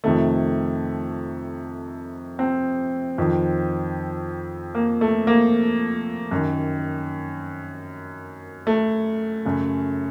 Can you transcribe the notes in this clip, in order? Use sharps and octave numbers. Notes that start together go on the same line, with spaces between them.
F2 C3 D#3 A3
C4
F2 D#3
A#3
A3
A#3
F#2 D#3
A3
F#2 C#3